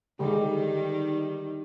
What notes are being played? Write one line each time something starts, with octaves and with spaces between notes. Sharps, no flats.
D3 D#3 G3 G#3 D#4 G4